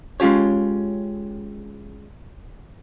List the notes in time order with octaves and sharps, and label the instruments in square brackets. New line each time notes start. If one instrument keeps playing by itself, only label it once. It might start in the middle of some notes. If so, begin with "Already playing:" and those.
[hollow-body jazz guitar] G#3 C#4 F4 G4 C#5